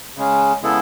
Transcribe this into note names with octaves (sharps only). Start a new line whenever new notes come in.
C#3 G#3 C#4
C#3 G#3 B3 E4 A4